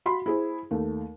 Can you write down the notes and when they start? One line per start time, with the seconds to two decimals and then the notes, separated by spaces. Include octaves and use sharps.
0.06 F#4 B5 C6
0.26 E4 G#4 C5
0.71 D#2 A3